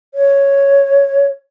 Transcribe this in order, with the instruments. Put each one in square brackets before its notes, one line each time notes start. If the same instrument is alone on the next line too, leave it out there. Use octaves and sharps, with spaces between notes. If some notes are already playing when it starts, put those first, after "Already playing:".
[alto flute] C#5